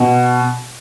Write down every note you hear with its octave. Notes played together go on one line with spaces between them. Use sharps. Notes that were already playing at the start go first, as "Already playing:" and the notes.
Already playing: B2